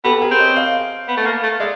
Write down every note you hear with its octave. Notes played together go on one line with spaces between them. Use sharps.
B3 G4 A4
G#4 A#4
C4
C#5 D#5
D#5 F5
B3
A3
A#3
A3
G#3 D5 E5